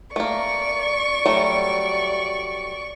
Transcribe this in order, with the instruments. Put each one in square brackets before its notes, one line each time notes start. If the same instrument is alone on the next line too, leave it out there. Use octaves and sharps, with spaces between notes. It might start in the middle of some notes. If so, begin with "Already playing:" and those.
[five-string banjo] A3 A#3 [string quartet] D5 C#6
[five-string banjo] F#3 G3 A3